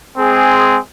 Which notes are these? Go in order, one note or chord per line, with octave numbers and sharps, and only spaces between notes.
G#3 C4 G#4